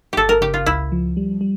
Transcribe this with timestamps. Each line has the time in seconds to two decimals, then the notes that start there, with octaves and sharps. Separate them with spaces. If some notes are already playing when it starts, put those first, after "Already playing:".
0.13 G1 G4 A4
0.29 A#4
0.41 C#3 G4
0.54 F4
0.66 C#2 E4
0.92 F3
1.17 G3
1.41 G3